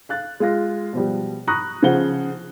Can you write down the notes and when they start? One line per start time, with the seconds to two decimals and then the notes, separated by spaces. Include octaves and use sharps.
0.09 F5 F#6 A6
0.40 G#3 F4 A#6
0.93 B2 F3 G3
1.47 A#5 B5 C#6 D#6 F#6 A#6
1.82 C#3 F3 C5 F#5 G7